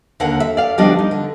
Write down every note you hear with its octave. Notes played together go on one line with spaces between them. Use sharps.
D#2 D3 A#4 F5 F#5
E5
D5 F5
D2 F3 G3 B3 D4 D#5
D#4
D3